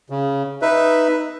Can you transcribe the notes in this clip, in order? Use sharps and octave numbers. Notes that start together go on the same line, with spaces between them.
C#3
D#4 B4 E5